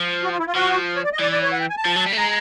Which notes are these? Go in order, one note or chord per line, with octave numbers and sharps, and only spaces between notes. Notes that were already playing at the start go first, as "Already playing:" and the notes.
Already playing: F3
F#4
F4
E4
F4
F3 F#4
C#5
D5
D#5
E3 D5
D5
C#5
F#5
G5
G#5
A5
F3
F#3
G3
A3
G#3 A#5